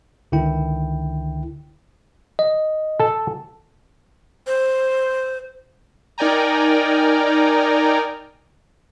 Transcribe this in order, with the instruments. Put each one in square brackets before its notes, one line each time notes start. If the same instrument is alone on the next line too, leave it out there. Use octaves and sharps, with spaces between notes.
[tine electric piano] C#2 D3 D#3 E4 G5
D#5
[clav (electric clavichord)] A4 A5
[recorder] C5
[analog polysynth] D#4 A#4 D5 G5 G#5 A#5